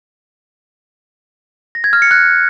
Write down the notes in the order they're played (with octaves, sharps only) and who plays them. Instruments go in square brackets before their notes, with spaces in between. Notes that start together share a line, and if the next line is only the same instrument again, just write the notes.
[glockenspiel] A#6
G#6
F6
C#7
F#6